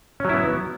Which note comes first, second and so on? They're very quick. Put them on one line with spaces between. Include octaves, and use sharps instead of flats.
C#4 F#3 E4 B3